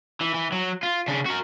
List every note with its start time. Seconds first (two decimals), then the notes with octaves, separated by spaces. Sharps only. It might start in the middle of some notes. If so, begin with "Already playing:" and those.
0.21 E3
0.34 E3
0.52 F#3
0.83 F4
1.08 C#3 D4
1.26 F#4 A#4